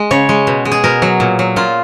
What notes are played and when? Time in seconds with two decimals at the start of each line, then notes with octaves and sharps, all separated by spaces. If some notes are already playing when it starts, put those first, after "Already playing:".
Already playing: G#3
0.11 C#3 C#5
0.29 G#3
0.47 B2
0.65 G#3
0.72 G#4
0.84 B2 A#4
1.02 F#3
1.20 A#2
1.39 F#3
1.56 A#2 F4